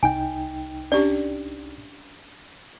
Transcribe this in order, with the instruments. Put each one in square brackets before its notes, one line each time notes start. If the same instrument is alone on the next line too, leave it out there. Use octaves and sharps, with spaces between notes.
[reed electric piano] C2 D#4 G5 [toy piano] G#5
[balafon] C#4 D4 G4 [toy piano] D5